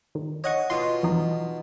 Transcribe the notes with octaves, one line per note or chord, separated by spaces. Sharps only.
D#3
C#5 D#5 F#5 C#6
B2 F4 C6
F2 E3 D#4